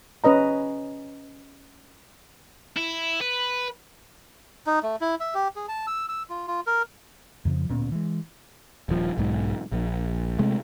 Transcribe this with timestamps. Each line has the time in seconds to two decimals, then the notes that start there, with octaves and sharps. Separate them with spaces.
0.24 C#4 B4 D#5 A#5
2.76 E4
3.21 B4
4.67 D#4
4.83 A3
5.01 E4
5.20 E5
5.34 G4
5.56 G#4
5.68 A5
5.87 E6
6.09 E6
6.30 F4
6.48 F4
6.67 A#4
7.45 F2 C#3 E3 F3
7.69 D1 A#2 B3 C#4
7.91 E3 G#3
8.89 D#1 F3
9.18 B1 G#2
9.72 A#1
10.39 C3 G#3 A3